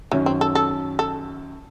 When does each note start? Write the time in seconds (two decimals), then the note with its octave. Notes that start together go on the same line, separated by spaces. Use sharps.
0.11 F#2 D#3 E3 F#3 C#4
0.26 C4
0.41 A4
0.55 A4
0.99 A4